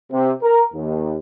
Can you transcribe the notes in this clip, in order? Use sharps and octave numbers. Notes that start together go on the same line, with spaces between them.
C3
A#4
D#2